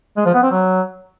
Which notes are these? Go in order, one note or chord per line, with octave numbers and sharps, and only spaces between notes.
G#3
F3
B3
C4
F#3